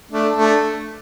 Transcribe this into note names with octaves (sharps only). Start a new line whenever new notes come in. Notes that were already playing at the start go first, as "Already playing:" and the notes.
A3 D4
A3 D4